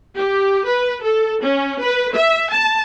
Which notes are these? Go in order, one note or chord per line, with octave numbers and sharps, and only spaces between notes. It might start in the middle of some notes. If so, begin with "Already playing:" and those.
G4
B4
A4
C#4
B4
E5
A5